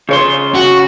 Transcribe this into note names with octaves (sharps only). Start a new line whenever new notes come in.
C#3 C#5 C6
F#4